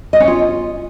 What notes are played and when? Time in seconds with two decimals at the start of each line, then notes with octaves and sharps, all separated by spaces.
0.13 D#5
0.20 C#4
0.28 F4